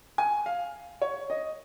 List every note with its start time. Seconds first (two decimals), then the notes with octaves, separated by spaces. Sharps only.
0.18 G#5
0.46 F5
1.02 C#5
1.30 D#5